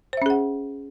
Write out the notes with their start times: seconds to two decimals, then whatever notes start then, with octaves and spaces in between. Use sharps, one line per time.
0.13 C5
0.17 E5
0.22 C#4
0.26 G#4
0.30 F#5